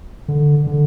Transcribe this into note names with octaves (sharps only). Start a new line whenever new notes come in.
D3
D3